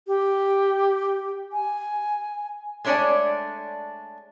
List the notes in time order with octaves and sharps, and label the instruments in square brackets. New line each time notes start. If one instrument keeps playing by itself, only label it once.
[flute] G4
G#5
[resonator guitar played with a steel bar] G#3 A3 D4 C#5 D5 G#5